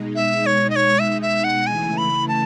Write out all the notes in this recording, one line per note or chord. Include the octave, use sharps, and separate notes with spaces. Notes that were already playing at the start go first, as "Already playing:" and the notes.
Already playing: B2 G#3 D#4
E5
C#5
D#5
C#5
E5
E5
F#5
C#3 E3 A3 E4 G#5
B5
A5